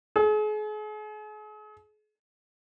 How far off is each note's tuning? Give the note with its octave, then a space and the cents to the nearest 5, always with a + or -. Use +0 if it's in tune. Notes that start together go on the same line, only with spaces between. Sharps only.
G#4 +40